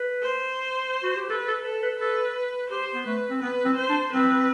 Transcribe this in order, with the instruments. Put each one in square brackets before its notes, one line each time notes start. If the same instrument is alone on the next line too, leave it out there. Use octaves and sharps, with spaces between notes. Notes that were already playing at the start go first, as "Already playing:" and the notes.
Already playing: [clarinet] B4
[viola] C5
[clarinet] F#4
G4
[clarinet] A4 [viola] B4
[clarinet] A4
[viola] A4 [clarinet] B4
[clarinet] B4
[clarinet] A4 [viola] B4
[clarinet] G4 [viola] C5
[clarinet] B3
[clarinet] A3 [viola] B4
[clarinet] C4
[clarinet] B3 [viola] B4
[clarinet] C4
[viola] C5
[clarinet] D4
[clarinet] C4 [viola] B4